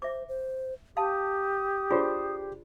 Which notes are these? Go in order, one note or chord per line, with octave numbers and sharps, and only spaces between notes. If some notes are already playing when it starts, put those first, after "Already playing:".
C5 E5 D6
C5
G4 F5 A5 D#6
D4 F4 G#4 C5